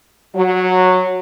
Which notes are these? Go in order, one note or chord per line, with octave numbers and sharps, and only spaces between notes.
F#3